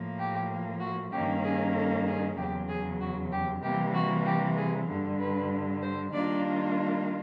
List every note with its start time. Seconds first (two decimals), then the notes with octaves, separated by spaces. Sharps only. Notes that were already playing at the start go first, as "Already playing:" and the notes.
Already playing: A2 F3 A#3
0.19 G4
0.81 F#4
1.12 G2 D#3 G3 A#3 C#4 G4
1.44 G#4
1.75 A4
2.07 G#4
2.37 E2 C#3 F#3 G4
2.69 G#4
3.00 F#4
3.32 G4
3.63 C3 E3 G3 A#3 G4
3.95 F#4
4.25 G4
4.57 G#4
4.88 G2 D3 G3
5.20 B4
5.82 C5
6.13 D#3 G3 A#3 D4 F4 D5